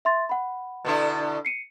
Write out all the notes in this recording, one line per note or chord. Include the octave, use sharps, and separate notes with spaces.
E5 C6 A6
F#5 B5
B2 D3 E4
C7 C#7 D#7